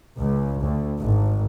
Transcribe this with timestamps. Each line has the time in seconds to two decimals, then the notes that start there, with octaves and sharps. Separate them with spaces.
0.19 C#2
0.62 D2
0.98 G#1